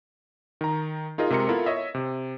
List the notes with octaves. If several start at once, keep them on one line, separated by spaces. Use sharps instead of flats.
D#3 A#5
D#4 F4 G#4 A#4 D#5
C3 G#3 A#4 C6 C#7
B3 E4 F4 A4 A#4
C#5 D#5 E5
C3